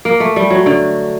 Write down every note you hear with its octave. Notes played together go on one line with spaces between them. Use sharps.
A#3
A3
G3
F#3
D3